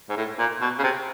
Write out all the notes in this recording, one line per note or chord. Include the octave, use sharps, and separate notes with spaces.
G#2
A2
A#2
B2
C#3
C3